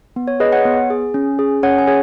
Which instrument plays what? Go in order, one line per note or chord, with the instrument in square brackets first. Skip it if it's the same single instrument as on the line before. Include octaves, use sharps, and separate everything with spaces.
[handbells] B3
C#5
G#4 B4 D#5
C#5 F#5
B3
G#4
C#4
G#4
C#4 C#5 F#5
G#5
G#4 C#5